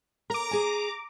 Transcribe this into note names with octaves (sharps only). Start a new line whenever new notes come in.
A#4 A#5 D6
G#4 G#5